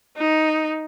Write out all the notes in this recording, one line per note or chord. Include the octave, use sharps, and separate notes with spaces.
D#4